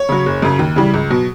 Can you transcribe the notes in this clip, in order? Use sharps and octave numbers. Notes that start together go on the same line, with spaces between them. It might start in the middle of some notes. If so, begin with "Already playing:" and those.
Already playing: C#5
C#3 F#3
F#1
F#2 C#3
D#2
C#3 E3 G3
C#2
B2 F#3